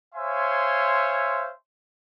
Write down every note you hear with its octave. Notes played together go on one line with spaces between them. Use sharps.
C5 C#5 E5 F5 G#5 C6